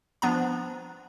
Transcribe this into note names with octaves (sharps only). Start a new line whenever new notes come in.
F3 B3 D4 A#5